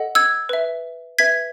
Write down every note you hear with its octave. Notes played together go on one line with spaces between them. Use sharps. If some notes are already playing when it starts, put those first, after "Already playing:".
Already playing: A4 D#5 F#5
E6 G#6
B4 E5
B4 E5 G#6 B6